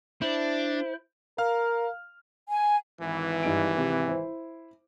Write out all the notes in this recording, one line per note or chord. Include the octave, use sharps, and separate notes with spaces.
D4 E4 C5
A#4 F5 F6
G#5
G#1 E3
G2 D#4 D7
C3 G4
E4 C5